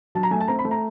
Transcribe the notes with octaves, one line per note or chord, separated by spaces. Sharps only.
F#3 A5
A#5
A3 G#5
A5
C4 A#5
B5
A3
A#5